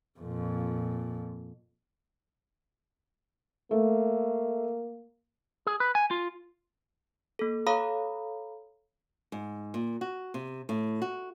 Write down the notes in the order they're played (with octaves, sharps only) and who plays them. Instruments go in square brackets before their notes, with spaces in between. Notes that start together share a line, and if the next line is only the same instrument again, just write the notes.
[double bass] F2 A#2
[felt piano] A3 [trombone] A#3
[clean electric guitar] G#4
B4
G#5
F4
[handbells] A#3 A4
A4 C#5 F5 A#5 B5 D#6
[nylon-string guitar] G#2
A#2
F#4
C3
A2
F#4